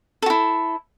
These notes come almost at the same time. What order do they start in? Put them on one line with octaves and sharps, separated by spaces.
A4 F#4 E4